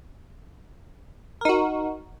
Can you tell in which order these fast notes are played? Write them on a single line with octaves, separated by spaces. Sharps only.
A#4 D#4 F#4